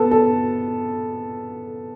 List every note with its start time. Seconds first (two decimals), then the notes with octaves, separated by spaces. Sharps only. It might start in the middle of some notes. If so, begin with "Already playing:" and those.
Already playing: B3 A4
0.11 A4